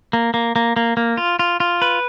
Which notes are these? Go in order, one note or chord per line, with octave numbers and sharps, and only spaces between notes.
A#3
A#3
A#3
A#3
A#3
F4
F4
F4
B4